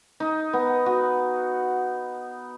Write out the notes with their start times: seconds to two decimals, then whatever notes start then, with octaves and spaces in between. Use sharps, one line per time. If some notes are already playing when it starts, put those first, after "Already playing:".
0.20 D#4
0.53 B3
0.86 F#4